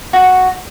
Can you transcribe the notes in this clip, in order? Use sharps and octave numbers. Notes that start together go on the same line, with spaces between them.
F#4